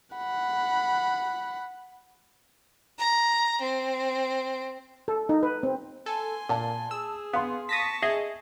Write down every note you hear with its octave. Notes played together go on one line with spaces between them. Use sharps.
F#5 B5
A#5
C4
A4
D#4
B4
C4
A4 G#5 C6
A#2 A5
G#4 E6
B3 F5 C6
A5 C#6 D#6 A#6 B6
G#4 D#5 E5